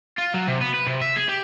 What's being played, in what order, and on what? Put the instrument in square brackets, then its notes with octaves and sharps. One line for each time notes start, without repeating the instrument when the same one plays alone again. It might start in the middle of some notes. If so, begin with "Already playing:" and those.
[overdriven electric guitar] F4
F#3
C3
B3
B4
C3
E5
G#4
G4